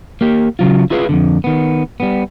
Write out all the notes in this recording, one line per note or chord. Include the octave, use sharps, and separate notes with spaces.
A#3 G4
C#3 F#3 F4
E4 F4 G#4 B4 D#5 F5
F2 A#2 D3
D#3 B3
G3 B3